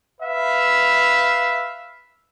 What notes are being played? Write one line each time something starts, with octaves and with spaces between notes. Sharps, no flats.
B4 E5 F5